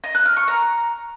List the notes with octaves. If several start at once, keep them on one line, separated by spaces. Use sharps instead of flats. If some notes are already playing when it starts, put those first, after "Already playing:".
D#5
F#6
F6
C#6
A#5